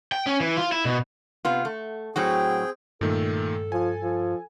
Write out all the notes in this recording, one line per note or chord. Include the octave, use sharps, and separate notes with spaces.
G5
C#4
E3
F4
E4
B2
C3 B3 F4
A3
A2 F#3 C4 F#4 G#4 G5
G2 A#2 D#3 A3 A4
F3 G#5
F3